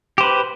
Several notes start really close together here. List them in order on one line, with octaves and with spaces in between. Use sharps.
G4 C5 B4